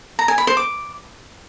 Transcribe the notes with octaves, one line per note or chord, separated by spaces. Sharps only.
A#5
G#5
B5
C5
D6